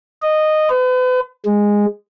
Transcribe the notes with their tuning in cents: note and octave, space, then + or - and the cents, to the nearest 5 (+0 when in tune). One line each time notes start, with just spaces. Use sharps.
D#5 -10
B4 +40
G#3 -10